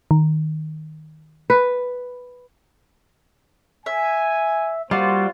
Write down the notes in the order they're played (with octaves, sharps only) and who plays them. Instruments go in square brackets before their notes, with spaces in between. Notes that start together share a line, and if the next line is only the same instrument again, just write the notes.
[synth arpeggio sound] D#3
[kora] B4
[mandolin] E5 [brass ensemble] G#5
[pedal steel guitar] G3 F#4 [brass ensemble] A#3 C5 [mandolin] F4